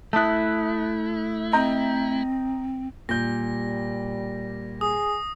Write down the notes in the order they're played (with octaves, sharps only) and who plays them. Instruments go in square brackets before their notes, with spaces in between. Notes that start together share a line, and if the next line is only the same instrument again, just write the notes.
[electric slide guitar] A3 E4 [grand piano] A5 D#6 F#6
[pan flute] C4 [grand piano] D#5 A#5 G6
[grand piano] A#2 G6 [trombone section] G3 [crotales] A#6
[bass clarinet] G#4 [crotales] D#6